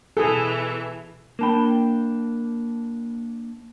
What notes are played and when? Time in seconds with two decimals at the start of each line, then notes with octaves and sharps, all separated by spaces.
0.17 B2 E3 G#4 A4
1.39 A#3 D4 A#4 G5 A5 B5